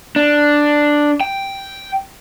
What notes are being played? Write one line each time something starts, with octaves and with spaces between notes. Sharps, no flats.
D4
G5